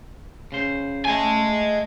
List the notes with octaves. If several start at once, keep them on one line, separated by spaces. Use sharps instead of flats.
C#3 C5
A3 A4 D#5 E5 G#5